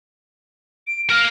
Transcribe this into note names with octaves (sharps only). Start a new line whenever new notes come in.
D7
A#4 F5 F6